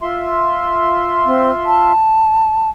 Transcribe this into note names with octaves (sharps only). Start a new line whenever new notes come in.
F4 E5 C6
C4
A5